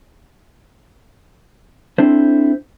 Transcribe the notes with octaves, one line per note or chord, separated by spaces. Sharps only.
C4 D4 E4 A4 C5